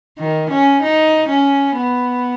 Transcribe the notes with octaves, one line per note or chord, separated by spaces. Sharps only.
D#3
C#4
D#4
C#4
B3